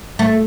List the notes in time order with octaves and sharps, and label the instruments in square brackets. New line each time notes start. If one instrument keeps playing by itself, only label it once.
[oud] A3